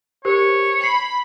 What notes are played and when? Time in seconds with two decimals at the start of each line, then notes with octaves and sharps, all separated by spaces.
0.25 G4 A#4 C5 C#5
0.83 B5 C7